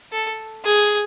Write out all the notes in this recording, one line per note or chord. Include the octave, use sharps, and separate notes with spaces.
A4
G#4